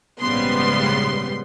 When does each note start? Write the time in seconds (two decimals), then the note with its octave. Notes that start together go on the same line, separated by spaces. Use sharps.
0.20 A#1 G#2 C#3 G3 B3 C6